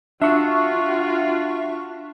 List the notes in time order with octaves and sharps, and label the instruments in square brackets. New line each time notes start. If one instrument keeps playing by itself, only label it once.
[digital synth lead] D4 [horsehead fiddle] F4 F#4 [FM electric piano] E5 C#6